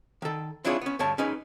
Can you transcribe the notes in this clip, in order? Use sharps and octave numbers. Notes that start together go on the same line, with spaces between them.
D#3 A4
C4 D4 E4 F4 G#4 C#5
B3 C#4
D2 G2 C#5 A5
C#4 D#4 G#4 B4